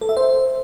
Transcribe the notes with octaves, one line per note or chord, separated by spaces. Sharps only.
A4
E5
C5